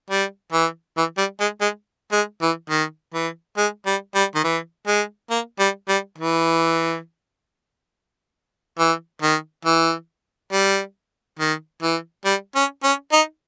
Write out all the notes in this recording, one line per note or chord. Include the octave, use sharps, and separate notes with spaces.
G3
E3
E3
G3
G#3
G#3
G#3
E3
D#3
E3
G#3
G3
G3
D#3
E3
G#3
A#3
G3
G3
E3
E3
D#3
E3
G3
D#3
E3
G3
C#4
C#4
D#4